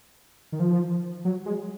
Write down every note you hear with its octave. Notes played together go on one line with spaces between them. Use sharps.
D#3
F3
F#3
G#3